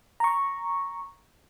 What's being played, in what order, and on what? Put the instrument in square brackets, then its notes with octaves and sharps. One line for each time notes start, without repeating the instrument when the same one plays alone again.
[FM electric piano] A#5 C#6